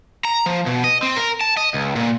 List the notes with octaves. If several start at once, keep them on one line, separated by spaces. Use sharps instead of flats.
A#5
F3
B2
D#5
C4
A#4
A5
D#5
C#2
A#2